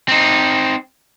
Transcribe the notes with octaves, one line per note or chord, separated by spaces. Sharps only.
C4 D#4